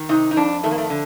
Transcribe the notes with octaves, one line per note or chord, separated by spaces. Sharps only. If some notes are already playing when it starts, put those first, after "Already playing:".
Already playing: D#3
C3 D#4
D#4
F2 D4
D#3 A3
A#3
A3
D3